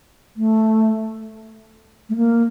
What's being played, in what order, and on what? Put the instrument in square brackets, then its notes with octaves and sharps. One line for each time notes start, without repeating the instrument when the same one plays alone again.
[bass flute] A3
A3
A#3